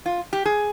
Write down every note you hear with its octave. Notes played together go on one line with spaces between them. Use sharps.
F4
G4
G#4